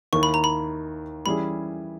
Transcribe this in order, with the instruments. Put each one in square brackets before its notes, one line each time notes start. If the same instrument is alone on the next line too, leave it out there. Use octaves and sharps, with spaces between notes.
[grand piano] D#2 D#3 A#3 E4 [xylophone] C#6
[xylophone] B5
A#5
B5
[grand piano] E3 G3 C#4 E4 G#4 [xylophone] B5